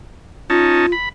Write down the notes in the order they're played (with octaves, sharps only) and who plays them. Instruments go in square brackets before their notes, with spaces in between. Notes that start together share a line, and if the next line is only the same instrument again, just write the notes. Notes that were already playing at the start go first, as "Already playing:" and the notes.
[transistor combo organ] C#4 D#4 A5 [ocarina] F4
[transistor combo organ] B5